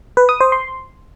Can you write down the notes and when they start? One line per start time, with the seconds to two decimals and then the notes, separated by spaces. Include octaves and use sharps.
0.17 B4
0.29 D#6
0.41 C5
0.52 C6